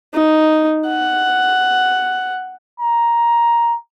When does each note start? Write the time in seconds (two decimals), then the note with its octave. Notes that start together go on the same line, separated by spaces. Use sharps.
0.13 D#4
0.88 F#5
2.80 A#5